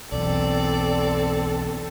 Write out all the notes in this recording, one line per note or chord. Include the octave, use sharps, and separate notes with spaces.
B1 E2 C4 A4 D5